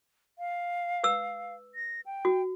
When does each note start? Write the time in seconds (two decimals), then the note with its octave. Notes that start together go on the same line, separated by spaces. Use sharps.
0.39 F5
1.04 B4 E6
1.75 A#6
2.06 G5
2.25 F#4